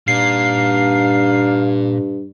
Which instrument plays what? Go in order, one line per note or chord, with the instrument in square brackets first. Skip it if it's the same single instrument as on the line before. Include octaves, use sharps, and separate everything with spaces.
[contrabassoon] G2 [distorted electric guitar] A#2 [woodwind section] D4 D#4 F5 [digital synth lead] C7